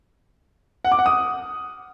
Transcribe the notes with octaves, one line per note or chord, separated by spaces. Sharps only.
F#5
D6
F#5
D#6